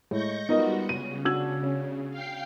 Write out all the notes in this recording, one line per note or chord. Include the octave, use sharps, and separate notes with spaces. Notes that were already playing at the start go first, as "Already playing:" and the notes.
A2 G#3 C#6 G6 A#6
G3 B3 D#4 F4 F#4 A#4 D#5
C#3 D#7
D4 F#4 E6 G#6 F#7
C#4
F5 G5 C7